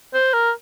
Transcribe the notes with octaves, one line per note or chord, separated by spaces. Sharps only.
C5
A#4